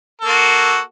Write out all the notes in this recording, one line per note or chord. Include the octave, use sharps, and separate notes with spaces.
A#3 F#4 A4